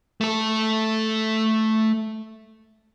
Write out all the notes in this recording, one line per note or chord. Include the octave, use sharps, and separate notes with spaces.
A3 A4